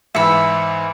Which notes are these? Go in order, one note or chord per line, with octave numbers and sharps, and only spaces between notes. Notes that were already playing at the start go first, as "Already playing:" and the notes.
G#2 E3 E5 B5 C#7